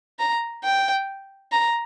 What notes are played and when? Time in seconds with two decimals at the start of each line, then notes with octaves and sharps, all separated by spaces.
0.19 A#5
0.64 G5
1.52 A#5